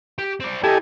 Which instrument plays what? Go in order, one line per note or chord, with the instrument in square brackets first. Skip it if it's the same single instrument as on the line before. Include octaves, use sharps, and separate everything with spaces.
[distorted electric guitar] G4
C4 D5
[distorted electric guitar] E4 D#5 [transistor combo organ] G4 A4 G#5